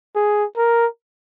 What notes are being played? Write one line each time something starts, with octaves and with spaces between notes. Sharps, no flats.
G#4
A#4